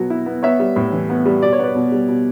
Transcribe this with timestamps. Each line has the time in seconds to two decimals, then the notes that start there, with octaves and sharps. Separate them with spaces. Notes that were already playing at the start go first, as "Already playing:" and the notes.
Already playing: B2 F#3 B3
0.10 E4
0.26 B3
0.43 B3 C#5 E5
0.59 G3
0.76 A2
0.92 E3
1.09 B3
1.25 G3
1.42 B2 D5
1.53 C#5
1.59 B3 B4 D5
1.75 B2
1.92 G3
2.08 B2